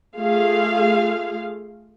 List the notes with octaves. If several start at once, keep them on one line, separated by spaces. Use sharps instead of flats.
A3 F4 G#4 F5